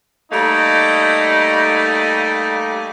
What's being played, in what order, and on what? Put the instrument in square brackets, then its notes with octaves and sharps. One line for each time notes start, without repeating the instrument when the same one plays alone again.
[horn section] G3 A3 A#3 D#4